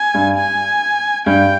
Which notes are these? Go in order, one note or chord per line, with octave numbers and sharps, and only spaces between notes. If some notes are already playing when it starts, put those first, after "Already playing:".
Already playing: G#5
G2
G#5
G2 G5